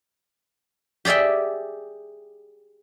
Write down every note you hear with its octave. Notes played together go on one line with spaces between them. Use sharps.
G4 G#4 D5 E5 G5